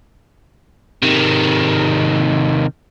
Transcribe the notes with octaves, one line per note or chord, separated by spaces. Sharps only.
C3 D#3